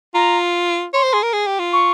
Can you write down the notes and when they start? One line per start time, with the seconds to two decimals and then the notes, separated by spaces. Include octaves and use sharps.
0.15 F4 A#5
0.94 C#5 C6
1.03 C5
1.13 G#4
1.23 A#4
1.33 G#4
1.47 G4
1.59 F4
1.73 C#6